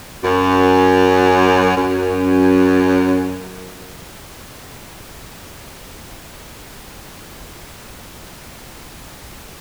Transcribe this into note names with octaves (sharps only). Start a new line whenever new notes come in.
F#2
F#2